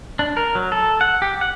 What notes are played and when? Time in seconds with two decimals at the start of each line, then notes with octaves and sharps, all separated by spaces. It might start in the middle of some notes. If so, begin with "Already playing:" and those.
0.19 D4
0.37 A#4
0.55 F#3
0.72 A4
1.01 F#5
1.22 G4
1.41 F#5